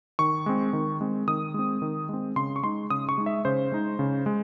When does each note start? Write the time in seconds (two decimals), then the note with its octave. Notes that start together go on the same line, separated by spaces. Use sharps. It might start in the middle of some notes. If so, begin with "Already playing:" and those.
0.19 D#3 C#6
0.46 G#3 C4
0.73 D#3
1.01 G#3 C4
1.28 D#3 D#6
1.54 G#3 C4
1.82 D#3
2.09 G#3 C4
2.36 C#3 C6
2.56 C#6
2.63 G#3 D#4 C6
2.90 C#3 D#6
3.09 C#6
3.18 G#3 D#4
3.26 E5
3.45 C#3 C5
3.72 G#3 D#4
3.99 C#3
4.26 G#3